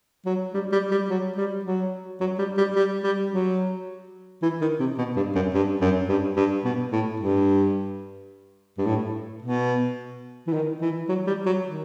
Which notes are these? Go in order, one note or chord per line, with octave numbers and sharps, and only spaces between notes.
F#3
G3
G3
G3
F#3
G3
F#3
F#3
G3
G3
G3
G3
F#3
E3
D#3
C3
B2
G2
F#2
G2
F#2
G2
G2
B2
A2
G2
G2
A2
B2
E3
D#3
E3
F#3
G3
F#3
D#3